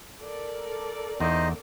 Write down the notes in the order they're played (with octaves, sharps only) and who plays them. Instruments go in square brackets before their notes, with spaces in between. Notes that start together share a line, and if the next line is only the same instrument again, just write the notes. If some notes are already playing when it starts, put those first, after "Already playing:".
[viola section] A4 A#4 D5
[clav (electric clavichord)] E2 [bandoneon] D#4 C5 D#5